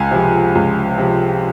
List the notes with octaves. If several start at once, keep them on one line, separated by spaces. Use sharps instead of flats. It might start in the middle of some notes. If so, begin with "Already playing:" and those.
Already playing: C#2 G#5
C3 F3
C#2
C3 F3